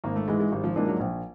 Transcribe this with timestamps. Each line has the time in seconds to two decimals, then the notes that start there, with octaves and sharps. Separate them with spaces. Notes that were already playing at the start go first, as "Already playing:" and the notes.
0.04 G#1 A#3
0.16 A3
0.28 G#2 E3 G#3
0.40 G#3
0.52 G#1 G3
0.64 F3
0.76 G#2 E3 F3 A#3 D4
0.88 F#3
1.00 A#1